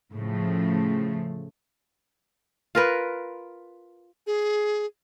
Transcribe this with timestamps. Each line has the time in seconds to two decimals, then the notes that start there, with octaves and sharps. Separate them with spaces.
0.12 A2 C#3 F3 A3
2.75 F4 A#4 B4
4.27 G#4